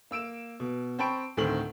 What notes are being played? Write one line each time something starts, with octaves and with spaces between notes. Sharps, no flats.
A#3 E6 D7 E7
B2
C4 G5 A5 B5 C#6 D7
D2 A2 D#3 C4 F#7